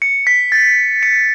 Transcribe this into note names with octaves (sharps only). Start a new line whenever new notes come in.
C#7
B6
A6
C#7